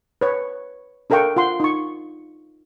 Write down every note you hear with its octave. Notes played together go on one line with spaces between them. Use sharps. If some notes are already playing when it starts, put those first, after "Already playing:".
B4 C#5
D4 A4 A#4 F5 G5 C#6
F4 F#5 C6
D#4 C#6